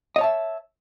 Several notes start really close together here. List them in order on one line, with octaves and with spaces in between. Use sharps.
D#5 C#5 A5 E5